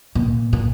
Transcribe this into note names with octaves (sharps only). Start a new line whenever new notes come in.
A#2
A#2